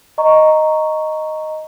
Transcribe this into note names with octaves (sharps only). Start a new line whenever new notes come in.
D#5 A#5 C#6